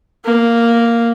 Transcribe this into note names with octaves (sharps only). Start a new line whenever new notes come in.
A#3